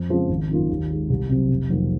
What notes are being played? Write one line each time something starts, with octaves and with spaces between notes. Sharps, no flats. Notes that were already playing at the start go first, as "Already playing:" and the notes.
Already playing: F2
C#3 F3 G#3 C4
G#1
F#2 D#3 A#3 F4
D#2
D#3 G#3
C2
C3 F#3 C4
F1
F2 D#3 F#3 A#3